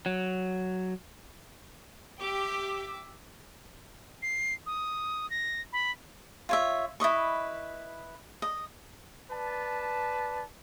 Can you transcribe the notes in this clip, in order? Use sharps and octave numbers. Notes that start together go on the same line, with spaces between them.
F#3
G4 E5 D6
C7
D#6
A#6
B5
F4 C#5 E5
E4 B4 D#5 C#6
D#5
B4 D5 A5